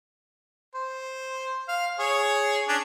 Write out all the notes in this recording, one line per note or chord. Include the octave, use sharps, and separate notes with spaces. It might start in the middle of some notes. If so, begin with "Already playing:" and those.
C5
F5
G#4 C#5
C#4 D4